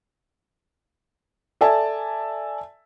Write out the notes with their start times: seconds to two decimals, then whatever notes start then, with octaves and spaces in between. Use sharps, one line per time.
1.61 A4 D5 E5 G#5 A5